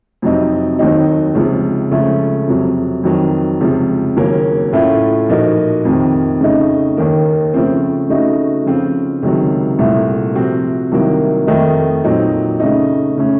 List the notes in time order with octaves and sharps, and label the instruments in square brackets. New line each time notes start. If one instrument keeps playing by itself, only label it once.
[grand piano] F2 C3 F#3 C4 D#4
D#2 D#3 F#3 C4 D#4
C#2 C3 F3
C#2 C#3 F3 A3 C#4
F2 C3 F#3
F2 D#3 F#3
C#2 C3 F3
D#2 C#3 F#3 A#3 C#4
A2 A3 C#4 F4
A#2 F3 A#3 D#4 F#4
F2 C3 D#3
C#3 A3 D#4
D#2 D#3 A#3
C#3 F3 A3 C4
C#3 A3 D#4 F#4
C#3 F3 C4 F4
C#2 C3 D#3 F#3
C2 A#2 A3
C3 F3 C4 F#4
C2 C3 D#3 F#3 A#3
F2 D#3 A3 D#4
A#2 F#3 C4 D#4
C#3 A3 D#4
C#3 A3 C#4